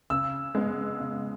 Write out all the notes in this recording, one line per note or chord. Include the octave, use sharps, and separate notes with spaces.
C#3 E6
G#3 B3
C#3